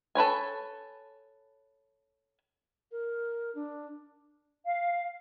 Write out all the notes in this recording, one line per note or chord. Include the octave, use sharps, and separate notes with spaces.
A4 B4 C#5 G#5
A#4
D4
F5